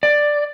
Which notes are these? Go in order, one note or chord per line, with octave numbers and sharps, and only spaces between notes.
D5